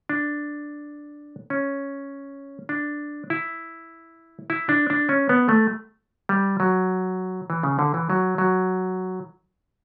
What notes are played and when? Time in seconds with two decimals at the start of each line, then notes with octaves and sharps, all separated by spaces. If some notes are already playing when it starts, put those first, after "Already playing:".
0.09 D4
1.50 C#4
2.69 D4
3.30 E4
4.50 E4
4.69 D4
4.90 D4
5.09 C#4
5.29 B3
5.49 A3
6.29 G3
6.60 F#3
7.50 E3
7.63 C#3
7.79 D3
7.94 E3
8.10 F#3
8.38 F#3